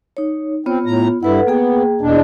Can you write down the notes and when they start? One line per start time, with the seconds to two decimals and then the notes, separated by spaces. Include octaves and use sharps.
0.17 D#4 C#5
0.66 B3 C4 F4 C#5
0.86 A2 A#5
1.23 G2 E4 A4 B4 F#5
1.47 A#3 B3 G#4 G5
2.01 E2 B2 D4